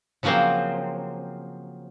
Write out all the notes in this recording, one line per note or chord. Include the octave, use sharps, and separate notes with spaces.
C#3 F3 F#3 A#3 C4